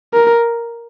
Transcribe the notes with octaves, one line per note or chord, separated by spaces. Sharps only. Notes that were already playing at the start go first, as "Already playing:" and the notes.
A#4